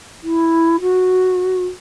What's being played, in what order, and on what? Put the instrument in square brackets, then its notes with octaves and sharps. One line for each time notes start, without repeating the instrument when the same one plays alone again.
[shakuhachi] E4
F#4